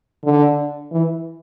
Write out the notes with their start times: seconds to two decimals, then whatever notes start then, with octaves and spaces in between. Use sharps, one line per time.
0.24 D3
0.91 E3